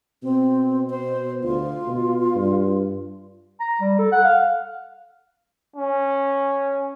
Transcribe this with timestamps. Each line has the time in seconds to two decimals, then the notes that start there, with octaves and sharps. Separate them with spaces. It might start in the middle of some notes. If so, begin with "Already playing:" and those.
0.23 B2 C4
0.90 C5
1.43 D2 F4
1.88 B2
2.36 G2
3.60 A#5
3.81 G3
3.99 A4
4.12 F#5
4.24 F5
5.76 C#4